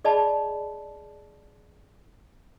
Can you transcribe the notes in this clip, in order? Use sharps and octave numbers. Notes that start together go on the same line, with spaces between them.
G#4 D5 D#5 A5 B5